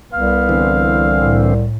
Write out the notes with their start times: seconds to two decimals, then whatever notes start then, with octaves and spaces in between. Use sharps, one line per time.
0.13 C2 B3 F5
0.49 D3 E3 C4
1.20 A2